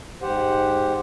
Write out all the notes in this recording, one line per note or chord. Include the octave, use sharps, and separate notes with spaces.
G#2 G4 C5 F#5